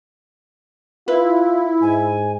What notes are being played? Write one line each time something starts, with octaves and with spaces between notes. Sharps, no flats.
E4 F4 B4
G#2 G#5